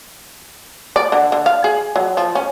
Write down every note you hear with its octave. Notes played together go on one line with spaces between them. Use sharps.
D5
D3
D3
F5
G#4
F#3
F3
C#4